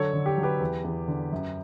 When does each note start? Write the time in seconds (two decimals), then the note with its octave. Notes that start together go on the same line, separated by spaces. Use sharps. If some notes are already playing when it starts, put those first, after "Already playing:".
Already playing: D3 F#3 A4 C#5
0.13 D3
0.26 G4
0.38 F#3
0.43 G4 B4
0.60 E2
0.84 E2
1.08 D3
1.32 F#2